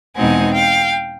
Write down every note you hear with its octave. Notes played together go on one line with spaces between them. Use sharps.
E2 B2 G#3 C4 D#4 F#5 G#5
F5 G5